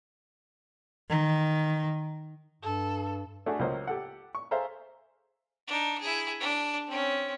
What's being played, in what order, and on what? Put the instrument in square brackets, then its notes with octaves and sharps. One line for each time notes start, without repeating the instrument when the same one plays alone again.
[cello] D#3
[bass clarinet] G2 [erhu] A4
[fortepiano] A3 D4 F#4 G#4
C#2 F#3 A#3 C5 D#5
G4 A4 F#5
C#6
G#4 A4 C5 E5 F5 A#5
[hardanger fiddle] D4 D#4
E4 G#4
D4
C4 C#4